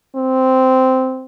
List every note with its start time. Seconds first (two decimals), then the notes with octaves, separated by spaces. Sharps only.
0.16 C4